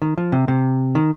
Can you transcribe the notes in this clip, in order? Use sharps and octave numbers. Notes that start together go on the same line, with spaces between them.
D#3
F3
C3
C3
D#3